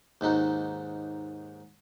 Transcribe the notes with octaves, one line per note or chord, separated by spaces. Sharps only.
D#2 G#2 D#4 F#4